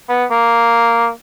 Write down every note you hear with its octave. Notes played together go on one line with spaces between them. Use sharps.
B3
A#3